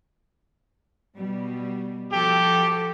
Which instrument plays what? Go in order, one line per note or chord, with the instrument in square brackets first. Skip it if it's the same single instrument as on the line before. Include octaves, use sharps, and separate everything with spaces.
[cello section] B2 G3
[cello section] F3 F#4 A4 [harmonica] G4 D6